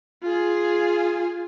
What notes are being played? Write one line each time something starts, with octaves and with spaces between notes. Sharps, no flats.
F4 G#4